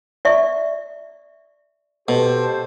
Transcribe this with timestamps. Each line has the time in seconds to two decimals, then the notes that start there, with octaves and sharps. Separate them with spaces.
0.25 D5 E5 C#6
2.08 B2 G4 A4 C5